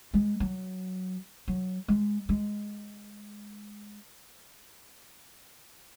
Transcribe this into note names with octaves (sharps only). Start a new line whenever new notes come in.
G#3
F#3
F#3
G#3
G#3